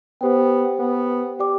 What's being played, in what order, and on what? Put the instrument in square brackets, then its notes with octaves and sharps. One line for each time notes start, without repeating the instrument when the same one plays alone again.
[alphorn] B3 [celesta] G4 C5 G5
[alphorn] B3
[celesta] G4 D5 G5 D6